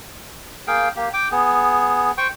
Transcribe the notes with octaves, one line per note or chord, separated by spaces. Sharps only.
A#3 G#4 F5 G5
A#3 G4
G5 D6
B3 G#4
C5 G5 C#6